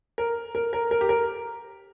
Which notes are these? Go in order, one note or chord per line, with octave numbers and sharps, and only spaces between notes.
A#4
A#4
A#4
A#4
G4
A#4